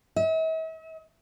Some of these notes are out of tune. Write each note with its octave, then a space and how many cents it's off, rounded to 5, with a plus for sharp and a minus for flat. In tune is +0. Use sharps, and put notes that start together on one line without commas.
E5 -45